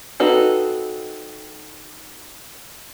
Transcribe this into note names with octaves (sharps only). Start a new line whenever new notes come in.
C4 D#4 F#4 A4 B4